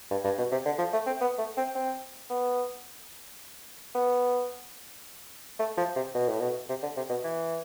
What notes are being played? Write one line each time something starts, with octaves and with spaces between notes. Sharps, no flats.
G2
G2
B2
C3
D3
F3
A3
C4
B3
A3
C4
C4
B3
B3
A3
F3
C3
B2
A2
B2
C3
D3
C3
B2
E3